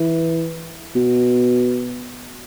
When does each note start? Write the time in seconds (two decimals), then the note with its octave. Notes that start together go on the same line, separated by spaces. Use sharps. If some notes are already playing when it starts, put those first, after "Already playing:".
Already playing: E3
0.95 B2